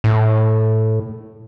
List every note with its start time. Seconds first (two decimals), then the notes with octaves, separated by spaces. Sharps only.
0.04 A2